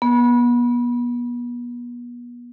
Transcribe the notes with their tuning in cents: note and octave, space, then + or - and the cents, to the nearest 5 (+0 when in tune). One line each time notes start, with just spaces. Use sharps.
B3 -35